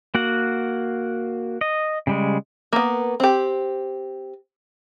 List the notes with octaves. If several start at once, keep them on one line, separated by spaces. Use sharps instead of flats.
A#3 F#4 F#5
D#5
C#3 G3 G#3
A#3 B3
C4 G4